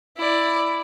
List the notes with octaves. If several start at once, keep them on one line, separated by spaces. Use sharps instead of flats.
E4 D5